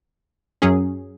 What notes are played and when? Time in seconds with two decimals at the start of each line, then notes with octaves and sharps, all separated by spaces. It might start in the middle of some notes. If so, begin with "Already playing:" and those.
0.62 F#2 F#3 C#4 G#4